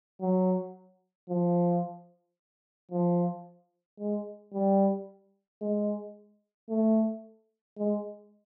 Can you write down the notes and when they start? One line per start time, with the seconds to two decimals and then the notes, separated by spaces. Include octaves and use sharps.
0.21 F#3
1.29 F3
2.91 F3
4.00 G#3
4.53 G3
5.62 G#3
6.70 A3
7.78 G#3